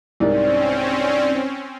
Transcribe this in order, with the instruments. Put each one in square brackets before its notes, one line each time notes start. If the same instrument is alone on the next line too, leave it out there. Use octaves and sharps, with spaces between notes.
[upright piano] C2 G#2 A#4 [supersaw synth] C4 C#4 [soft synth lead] D5